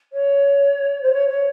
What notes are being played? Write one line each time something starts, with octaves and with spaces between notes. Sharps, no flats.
C#5
C5
C#5
C#5